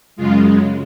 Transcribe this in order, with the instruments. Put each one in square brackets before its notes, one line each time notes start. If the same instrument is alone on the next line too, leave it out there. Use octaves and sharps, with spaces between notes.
[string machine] F#2 C#3 G#3 F4